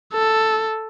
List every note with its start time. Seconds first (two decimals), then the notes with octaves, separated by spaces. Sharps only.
0.14 A4